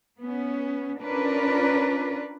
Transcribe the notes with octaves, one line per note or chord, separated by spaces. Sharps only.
B3 C#4
C#4 D4 F4 A#4 B4 D5